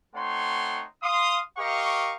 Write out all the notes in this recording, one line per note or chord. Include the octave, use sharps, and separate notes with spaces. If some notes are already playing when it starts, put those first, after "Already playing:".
A3 C4 D#4 C#5 F#5 C6
F5 C6 D#6
G4 A#4 D#5 F5 C#6